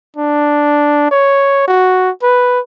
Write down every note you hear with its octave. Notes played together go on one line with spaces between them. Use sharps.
D4
C#5
F#4
B4